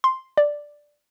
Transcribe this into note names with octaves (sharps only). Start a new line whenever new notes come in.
C6
D5